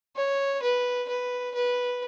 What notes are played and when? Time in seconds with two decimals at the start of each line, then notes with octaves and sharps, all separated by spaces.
0.16 C#5
0.62 B4
1.08 B4
1.54 B4